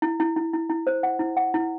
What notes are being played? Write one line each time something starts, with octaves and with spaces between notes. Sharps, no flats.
E4
E4
E4
E4
E4
C5
F#5
E4
F#5
E4